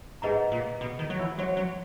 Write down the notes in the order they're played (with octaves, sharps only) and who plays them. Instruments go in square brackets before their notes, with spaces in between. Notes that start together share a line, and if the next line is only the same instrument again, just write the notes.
[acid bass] G#2 [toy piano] G#4 B4 D#5 F#5 A#5
[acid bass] A#2
B2
D#3
F#3
E3
[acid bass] F#3 [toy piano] F#4 C#5 F#5
[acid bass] F#3